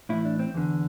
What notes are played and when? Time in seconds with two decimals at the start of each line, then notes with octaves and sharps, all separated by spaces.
0.09 A2 E3 E4
0.25 D4
0.39 C4
0.54 E2 D3